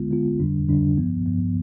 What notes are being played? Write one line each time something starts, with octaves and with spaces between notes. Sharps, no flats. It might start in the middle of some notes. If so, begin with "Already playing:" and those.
Already playing: D3 G#3 B3 F4
D3 G#3 B3 F4
F2 D3 G3 D4
F2 D3 G3 D4
G2 F3 B3
G2 F3 B3